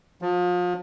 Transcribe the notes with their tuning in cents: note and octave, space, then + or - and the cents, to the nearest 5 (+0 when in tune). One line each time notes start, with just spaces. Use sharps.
F3 +35